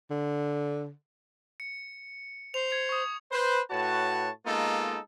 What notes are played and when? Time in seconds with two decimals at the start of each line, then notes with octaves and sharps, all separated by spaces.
0.10 D3
1.60 C#7
2.54 C5 F7
2.70 G#6 C#7 F7
2.89 C#6 D#6
3.32 B4 C5
3.71 A2 F#4 B4 C#5 A5
4.46 G#3 A#3 B3 D#4 F4 A4